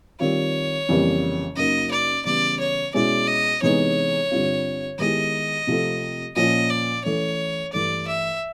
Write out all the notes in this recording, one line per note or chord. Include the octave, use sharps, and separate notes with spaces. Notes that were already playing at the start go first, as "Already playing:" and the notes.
D#3 G3 C4 F4 C#5
F2 C#3 E3 G3 A#3
F#2 C#3 F#3 A#3 D#4 D#5
D5
C#3 E3 G3 B3 D5
C#5
B2 G#3 C#4 E4 D5
D#5
C3 E3 G#3 B3 D#4 C#5
G2 D3 G3 C4 F4
D#3 G#3 B3 E4 G4 D#5
C3 F3 A3 C4
A#2 F3 A#3 C#4 D#5
D5
E3 A3 C#4 C#5
G2 E3 A3 D5
E5